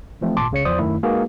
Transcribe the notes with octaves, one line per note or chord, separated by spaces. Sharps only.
E3 F3 A3 C4
G#1 A#2 A5 C6 D6
C#2 C#3 C#5 C#7
E2 F3 C5 D5 D#6
F#2 D#3 A3 E4
G#3 A#3 D#4 F#4 G#4 B4